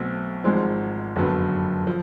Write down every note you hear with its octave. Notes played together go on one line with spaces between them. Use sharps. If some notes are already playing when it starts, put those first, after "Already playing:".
Already playing: B1 B2 F#3 A3 C4
G#1 G#2 F3 G#3 C4
F#1 F2 D3 F#3 B3
F3